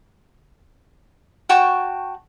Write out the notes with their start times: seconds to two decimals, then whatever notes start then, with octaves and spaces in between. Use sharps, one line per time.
1.49 F#4 G5 A5 C#6